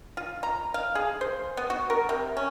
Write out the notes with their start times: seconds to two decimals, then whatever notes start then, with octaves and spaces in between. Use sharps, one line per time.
0.17 F4
0.43 A#5
0.74 F5
0.95 G#4
1.21 C5
1.57 B3
1.70 F#4
1.90 A#4
2.09 C3
2.37 C#4